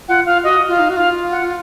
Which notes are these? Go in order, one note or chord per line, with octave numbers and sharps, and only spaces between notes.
F4 F#5
F4 F5
F#4 D#5
F4 F5
D#4
F#4
F4 F5
F#5